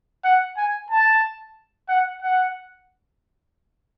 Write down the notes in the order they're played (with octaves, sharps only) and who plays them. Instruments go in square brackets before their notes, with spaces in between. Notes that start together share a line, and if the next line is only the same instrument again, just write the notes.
[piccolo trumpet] F#5
G#5
A5
F#5
F#5